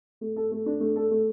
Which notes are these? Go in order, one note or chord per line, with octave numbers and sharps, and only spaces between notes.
A3
A4
A3
D4
A3
A4
A3